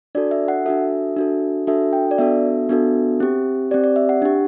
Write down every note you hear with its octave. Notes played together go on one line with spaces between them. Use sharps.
D4 F#4 A4 D5
E5
F#5
D4 F#4 A4 E5
D4 F#4 A4
D4 F#4 A4 E5
G5
D5
B3 D4 F#4 A4 E5
B3 D4 F#4 A4
C4 G4
C4 G4 D5
D5
E5
F#5
D4 G4